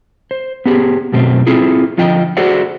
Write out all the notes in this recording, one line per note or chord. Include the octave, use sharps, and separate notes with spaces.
C5
B3 G4 G#4
F#2 B2 A3 C4
C4 E4 F4 G#4 A4
D3 F3 F4 D#5 G5
F#4 G#4 A4 C5 D5 F#5